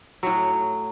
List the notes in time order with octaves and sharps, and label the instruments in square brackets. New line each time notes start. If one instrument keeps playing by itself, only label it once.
[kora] A2 F#3